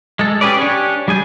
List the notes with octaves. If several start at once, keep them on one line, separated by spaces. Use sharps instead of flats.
G#3 A4
C#4 G4 G#4 B4 D5
D4 G4 C#5 G#5
G3 G#4 G#5 G6